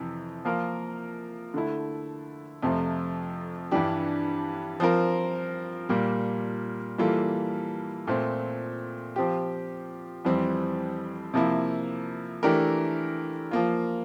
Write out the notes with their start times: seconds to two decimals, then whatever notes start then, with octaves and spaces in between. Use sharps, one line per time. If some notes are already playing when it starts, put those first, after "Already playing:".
Already playing: F2 C3 E3
0.45 F3 A#3 F4 A#4
1.54 D3 A3 E4
2.63 F2 C3 F3 A3 C4
3.71 G2 E3 G3 D4 G4
4.80 F3 C4 F4 A#4
5.89 A#2 G3 A#3
6.98 E3 G3 A#3 F4 A4
8.07 A#2 A3 C4
9.16 F3 C4 G4
10.25 F2 E3 G3 C4
11.34 C3 F3 A#3 E4
12.43 E3 A3 D4 G4 A#4
13.51 F3 A#3 F4